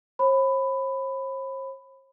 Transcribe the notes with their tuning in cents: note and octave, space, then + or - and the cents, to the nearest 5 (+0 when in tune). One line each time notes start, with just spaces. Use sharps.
C5 +45 B5 +15